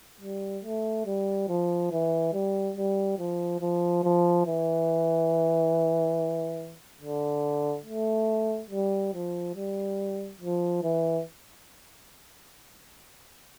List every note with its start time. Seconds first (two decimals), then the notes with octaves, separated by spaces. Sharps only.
0.21 G3
0.64 A3
1.06 G3
1.48 F3
1.92 E3
2.33 G3
2.77 G3
3.19 F3
3.61 F3
4.04 F3
4.47 E3
7.01 D3
7.85 A3
8.71 G3
9.14 F3
9.56 G3
10.41 F3
10.83 E3